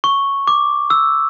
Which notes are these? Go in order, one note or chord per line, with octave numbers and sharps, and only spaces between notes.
C#6
D6
E6